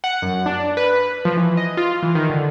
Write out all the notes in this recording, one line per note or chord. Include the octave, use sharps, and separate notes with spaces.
F#5
F#2
D4
B4
F3
E3
D#5
F4
E3
D#3
D3